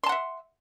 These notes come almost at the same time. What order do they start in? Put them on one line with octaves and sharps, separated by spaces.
C6 A5 F#5 E5